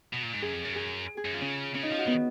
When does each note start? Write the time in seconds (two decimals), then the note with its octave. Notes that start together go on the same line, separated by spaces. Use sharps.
0.13 B2
0.23 A#2
0.33 G#2
0.42 F#2 G#4
0.53 F2
0.64 F#2
0.76 G#4
1.17 G#4
1.25 F#2
1.34 F4
1.41 C#3 C#4
1.74 C#3 C#4
1.83 D#4
1.91 F3 F4
1.99 F#4
2.07 D#3 B3